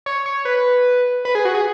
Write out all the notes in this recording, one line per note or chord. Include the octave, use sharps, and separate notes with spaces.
C#5
C#5
B4
B4
G#4
F#4
G#4